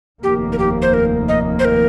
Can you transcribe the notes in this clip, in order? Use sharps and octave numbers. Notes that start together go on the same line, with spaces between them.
F1 D#2 D#3 A#3 G4
A#4
G4
C5
A#4
D#5
C5
A#4